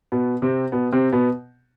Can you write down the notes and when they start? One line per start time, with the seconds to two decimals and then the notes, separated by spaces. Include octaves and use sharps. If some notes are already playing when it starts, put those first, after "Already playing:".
0.12 B2 B3
0.42 C3 C4
0.72 B2 B3
0.92 C3 C4
1.12 B2 B3